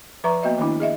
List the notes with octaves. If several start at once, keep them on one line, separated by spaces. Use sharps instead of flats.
F3 B4 E5 A#5 C#6
A#3 B3 F#4 D#5 E5
D#3 A3 B3 D4 E4
G#4 D#5 E5